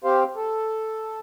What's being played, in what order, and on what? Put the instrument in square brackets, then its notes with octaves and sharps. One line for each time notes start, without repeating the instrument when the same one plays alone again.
[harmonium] C4 G4 C5 F5
A4